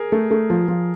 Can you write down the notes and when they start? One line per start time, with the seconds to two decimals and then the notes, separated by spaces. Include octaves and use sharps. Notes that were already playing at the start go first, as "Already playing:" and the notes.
Already playing: G#4 A#4
0.12 A3
0.31 A3
0.50 F3
0.68 F3